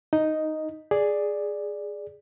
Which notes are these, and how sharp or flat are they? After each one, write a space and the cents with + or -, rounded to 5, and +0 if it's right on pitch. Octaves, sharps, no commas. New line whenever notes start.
D#4 +0 D#5 +0
G#4 +0 D5 +0